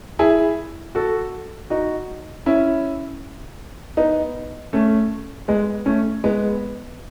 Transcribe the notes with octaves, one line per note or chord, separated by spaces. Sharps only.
E4 G#4
F#4 A4
D#4 F#4
C#4 E4
B3 D#4
A3 C#4
G#3 B3
A3 C#4
G#3 B3